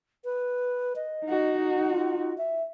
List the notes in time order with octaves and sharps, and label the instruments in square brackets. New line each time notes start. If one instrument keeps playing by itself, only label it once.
[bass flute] B4
D#5
[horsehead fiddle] D#4 F#4
[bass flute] F4
E5